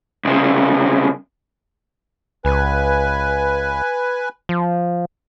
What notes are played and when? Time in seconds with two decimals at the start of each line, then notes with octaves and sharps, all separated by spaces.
0.25 C2 C#3
2.45 C#2 B4 G#5
4.49 F3